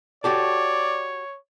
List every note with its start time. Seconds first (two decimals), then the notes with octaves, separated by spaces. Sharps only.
0.24 F#4 G4 A4 C#5 D5